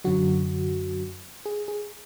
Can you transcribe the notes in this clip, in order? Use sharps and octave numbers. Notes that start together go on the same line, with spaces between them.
F#2 D3 F#3 F#4
G#4
G#4